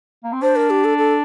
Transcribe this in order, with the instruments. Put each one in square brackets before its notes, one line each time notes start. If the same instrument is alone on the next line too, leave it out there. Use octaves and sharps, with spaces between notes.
[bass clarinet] A#3
C4
[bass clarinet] D4 [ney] C5
[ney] A#4
G4
A4
A4